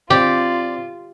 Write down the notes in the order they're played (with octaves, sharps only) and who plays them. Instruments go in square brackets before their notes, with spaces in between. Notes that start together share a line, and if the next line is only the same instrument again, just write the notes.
[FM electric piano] C4 [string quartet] F4 [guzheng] G4 [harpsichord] D5